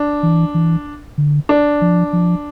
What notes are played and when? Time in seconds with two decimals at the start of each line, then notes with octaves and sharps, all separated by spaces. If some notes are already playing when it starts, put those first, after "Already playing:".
Already playing: D4
0.23 E3
0.54 E3
1.18 D3
1.49 D4
1.81 F3
2.13 F3